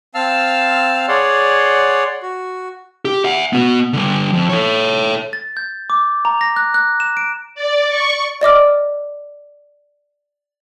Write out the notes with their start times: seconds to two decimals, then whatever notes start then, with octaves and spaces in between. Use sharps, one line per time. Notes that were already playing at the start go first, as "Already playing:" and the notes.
0.15 C4 F5 A5 E6 F6
1.08 G#4 C#5 D5 F#5 C6
2.23 F#4
3.05 G4
3.24 E5 F#5
3.53 B3 F#4
3.93 D3 G3
4.34 F2
4.49 A4 C#5
5.33 A6
5.57 G6
5.90 D6
6.25 A#5
6.41 A#6
6.56 F#6
6.74 F#6
7.00 E7
7.17 D7
7.55 D5
7.89 C#6
8.41 D5 D#5 D6 F6